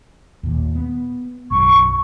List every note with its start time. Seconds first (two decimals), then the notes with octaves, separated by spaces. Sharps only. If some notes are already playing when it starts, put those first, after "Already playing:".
0.43 D#2 A#2
0.75 B3
1.51 B1 F#2 C#6